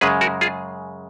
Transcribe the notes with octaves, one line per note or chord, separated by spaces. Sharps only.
F#2 C#3 G#3 G#4 B4
F#4 A#4
F4 G#4